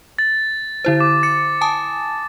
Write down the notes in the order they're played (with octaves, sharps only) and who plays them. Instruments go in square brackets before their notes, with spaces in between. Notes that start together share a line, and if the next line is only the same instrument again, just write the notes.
[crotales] A6
[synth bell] D3 E4 C5
[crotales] D6
[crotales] A6 [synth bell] C#7
[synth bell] G#5 A5 D#6